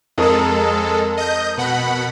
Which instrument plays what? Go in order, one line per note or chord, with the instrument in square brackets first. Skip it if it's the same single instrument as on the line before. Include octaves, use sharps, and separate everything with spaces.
[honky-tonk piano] F2 A#4 D#6 [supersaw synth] G#3 A4
[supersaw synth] D#5 G6
B2 F#5 B5